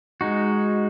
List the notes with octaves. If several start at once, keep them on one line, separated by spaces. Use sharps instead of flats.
G#3 D#4 F#4